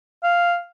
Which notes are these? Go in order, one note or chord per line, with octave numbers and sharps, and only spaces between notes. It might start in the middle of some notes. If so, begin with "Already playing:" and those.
F5